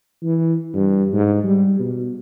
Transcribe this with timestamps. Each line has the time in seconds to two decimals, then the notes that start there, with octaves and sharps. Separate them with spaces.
0.23 E3
0.73 G2
1.13 G#2
1.43 G3
1.79 B2